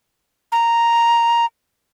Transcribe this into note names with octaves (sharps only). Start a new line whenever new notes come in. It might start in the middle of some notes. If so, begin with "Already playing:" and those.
A#5